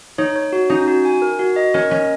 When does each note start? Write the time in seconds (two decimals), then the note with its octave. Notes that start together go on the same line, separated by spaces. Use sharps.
0.18 D#4 C#5
0.36 C#5
0.53 F#4
0.69 C#4 D#4
0.88 F#4
1.05 G#5
1.22 A#4
1.39 F#4
1.56 D#5
1.74 C#4 A#4
1.91 C#4 D#5